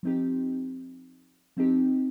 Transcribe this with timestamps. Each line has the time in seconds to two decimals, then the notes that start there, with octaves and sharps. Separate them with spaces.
0.03 F3 C4 D#4 G4
1.57 F3 C4 D#4 G4